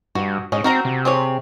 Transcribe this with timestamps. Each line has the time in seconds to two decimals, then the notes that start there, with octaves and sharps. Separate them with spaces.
0.15 G2 F#4
0.52 G#2 C#4 D#5
0.64 C4 F#4 A#4 A#5
0.85 C3
1.05 C4 G#4 C#5